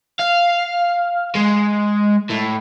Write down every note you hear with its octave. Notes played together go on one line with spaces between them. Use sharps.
F5
G#3
A2